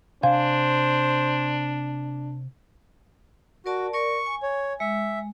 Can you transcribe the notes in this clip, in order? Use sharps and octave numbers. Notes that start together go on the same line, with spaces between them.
C3 D4 C5 F5 G#5
F#4 A#4 D5 A5
A#4 D5 C#6
G#5
C#5
G#3 E5